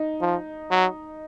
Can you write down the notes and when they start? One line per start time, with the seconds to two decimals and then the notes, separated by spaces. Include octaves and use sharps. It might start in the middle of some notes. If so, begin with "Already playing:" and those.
Already playing: D#4
0.21 F3
0.71 F#3